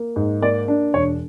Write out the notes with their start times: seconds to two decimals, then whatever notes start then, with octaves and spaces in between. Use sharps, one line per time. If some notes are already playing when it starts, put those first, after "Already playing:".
Already playing: A#3
0.16 G#2
0.42 A#3 D5
0.68 D4
0.94 E1 C#5